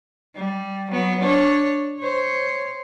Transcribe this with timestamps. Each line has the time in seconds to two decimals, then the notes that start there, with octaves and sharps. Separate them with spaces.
0.36 G3
0.91 F#3 B3
1.21 D4 C#5
2.00 C5 C#5